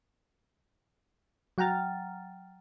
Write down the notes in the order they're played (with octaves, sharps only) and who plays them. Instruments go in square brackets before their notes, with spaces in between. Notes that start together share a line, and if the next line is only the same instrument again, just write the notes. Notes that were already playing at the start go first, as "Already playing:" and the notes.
[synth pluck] F#3 F#5 G5 A#5 F6 A6